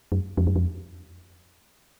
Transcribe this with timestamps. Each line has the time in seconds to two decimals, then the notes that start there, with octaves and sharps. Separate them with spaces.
0.12 F#2
0.37 F2
0.47 F#2
0.56 F2